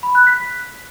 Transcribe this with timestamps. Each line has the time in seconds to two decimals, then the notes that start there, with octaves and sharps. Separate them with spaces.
0.03 B5
0.15 F#6
0.27 B6